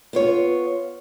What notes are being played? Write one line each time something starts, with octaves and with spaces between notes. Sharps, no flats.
B3 F4 C#5